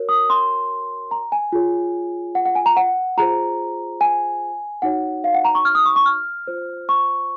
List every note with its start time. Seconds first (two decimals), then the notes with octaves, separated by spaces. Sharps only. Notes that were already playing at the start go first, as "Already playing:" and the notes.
Already playing: F#4 A#4 C#5
0.09 D#6
0.30 C6
1.11 A#5
1.32 G#5
1.53 F4 G#4 C#5
2.35 F#5
2.46 F#5
2.55 G#5
2.66 A#5
2.77 F#5
3.18 F4 G#4 C5 A#5
4.01 G#5
4.82 D#4 F#4 C#5 F#5
5.24 F5
5.34 F#5
5.45 A#5
5.55 C#6
5.65 F6
5.75 D#6
5.86 C#6
5.96 C#6
6.06 F6
6.47 F4 C5
6.89 C#6